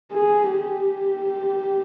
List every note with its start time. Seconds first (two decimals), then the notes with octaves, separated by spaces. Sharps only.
0.13 G#4
0.52 G4